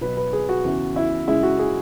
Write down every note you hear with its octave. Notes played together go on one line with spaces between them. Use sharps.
B2 F#3 B4
B4
G#4
F#4
E2 C#3 E3
E4
F#2 C#3 G#3 E4
F#4
G#4